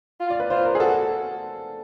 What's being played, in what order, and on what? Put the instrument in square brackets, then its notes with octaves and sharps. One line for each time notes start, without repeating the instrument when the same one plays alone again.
[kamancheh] F4
[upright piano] D5
B4
[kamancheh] F4 [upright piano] C5
[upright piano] A#4
G#4
[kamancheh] F#4 [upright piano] A4